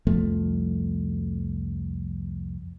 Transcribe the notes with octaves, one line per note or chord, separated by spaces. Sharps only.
C2 F2 F3 A3